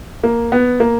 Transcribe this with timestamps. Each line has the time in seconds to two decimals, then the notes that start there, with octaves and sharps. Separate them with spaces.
0.23 A#3
0.52 B3
0.80 A#3